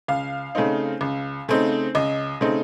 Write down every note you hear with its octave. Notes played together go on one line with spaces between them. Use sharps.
C#2 F5
C#3 A3 C4 D#4
C#2
C#3 A3 C4 D#4
C#2 D#5
C#3 A3 C4 D#4